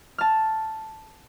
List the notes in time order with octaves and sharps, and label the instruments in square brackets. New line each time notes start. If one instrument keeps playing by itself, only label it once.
[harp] A5 F6